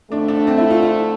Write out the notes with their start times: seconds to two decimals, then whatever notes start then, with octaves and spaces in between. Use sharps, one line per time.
0.11 F2 D3 A3 D4
0.28 D4
0.47 C4
0.58 E4
0.70 F4
0.83 F4